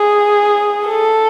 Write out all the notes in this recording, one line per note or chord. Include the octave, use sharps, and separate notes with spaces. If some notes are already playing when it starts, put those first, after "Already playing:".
Already playing: G#4
A4